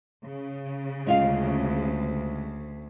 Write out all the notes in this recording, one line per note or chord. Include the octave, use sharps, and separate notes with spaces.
C#3
D2 G#3 F4 F5